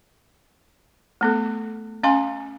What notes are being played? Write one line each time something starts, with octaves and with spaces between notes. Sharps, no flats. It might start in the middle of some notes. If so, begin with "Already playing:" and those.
A3 B3 A4
C#4 F5 G#5 C6